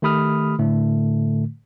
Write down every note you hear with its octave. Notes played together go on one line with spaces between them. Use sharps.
D#3 A3 G4 B5 D#6 F6
A2 D3 A3